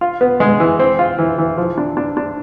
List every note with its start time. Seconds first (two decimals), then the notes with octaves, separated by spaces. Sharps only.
0.01 F4
0.21 B3
0.40 G#3
0.60 E3
0.79 C4
0.99 F4
1.19 E3
1.38 E3
1.58 F3
1.78 D4
1.97 D4
2.17 D4